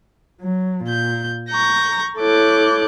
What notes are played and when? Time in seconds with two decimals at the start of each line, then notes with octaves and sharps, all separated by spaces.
0.41 F#3
0.84 A#2 G6
1.50 A#5 C#6 G6 A#6
2.19 E4 A4 C#5 D6 F#6 G6